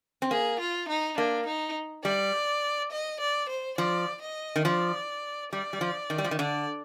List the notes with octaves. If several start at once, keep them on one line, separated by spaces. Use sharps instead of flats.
C4
A#3 G#4
F4
D#4
A#3 D4
D#4
G3 D5
D#5
D5
C5
F3 D5
D#5
D#3
F3 D5
G3 D5
G3
F3
D#3
G3
F3
D#3
D3 D5